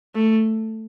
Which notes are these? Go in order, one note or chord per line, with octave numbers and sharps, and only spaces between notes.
A3